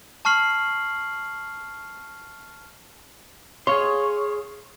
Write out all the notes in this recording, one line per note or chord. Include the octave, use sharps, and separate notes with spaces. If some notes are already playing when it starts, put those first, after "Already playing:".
A5 C#6 F6 C7 F#7
G#4 C#5 F5 C6